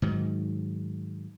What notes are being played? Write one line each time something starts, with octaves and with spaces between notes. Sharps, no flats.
G#2 D#3 F#3